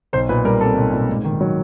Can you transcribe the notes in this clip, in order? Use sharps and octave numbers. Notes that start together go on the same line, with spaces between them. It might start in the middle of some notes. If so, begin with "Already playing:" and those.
B1 C5
A#2 B4
G3 A#4
C4 A4
B1
A#2
G#2
D#3
F#3